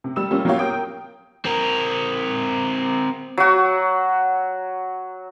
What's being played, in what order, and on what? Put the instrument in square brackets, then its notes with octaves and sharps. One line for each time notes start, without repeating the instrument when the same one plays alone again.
[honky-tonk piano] C3
G3 E6 E7
G3 A#3 C#4 F4
F#3 A#3 F4 G4 C#5 F5
A#4 G5 D#6 G6
[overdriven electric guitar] C4 A#4
[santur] F#3 F#4